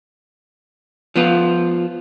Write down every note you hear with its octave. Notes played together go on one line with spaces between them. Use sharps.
F3 B3 F4